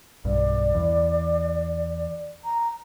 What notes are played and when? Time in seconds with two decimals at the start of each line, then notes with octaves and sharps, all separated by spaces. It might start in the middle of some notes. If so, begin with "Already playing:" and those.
0.25 B1 G2 D5
0.75 E2
2.44 A#5